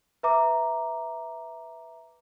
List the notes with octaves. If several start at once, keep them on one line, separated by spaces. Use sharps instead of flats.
B4 E5 A#5 D6